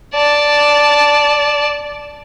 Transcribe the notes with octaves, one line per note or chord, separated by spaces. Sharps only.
D5 A5